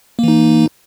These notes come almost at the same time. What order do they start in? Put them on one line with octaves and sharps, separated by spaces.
A#3 E3 D#4